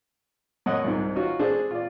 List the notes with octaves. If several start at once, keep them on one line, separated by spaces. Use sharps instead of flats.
F#2 C#4 D#5 F#5 D#6
C2 G#2
C#4 D#4 F4 F#4
G#3 D4 G#4 A4 C5
F4 D5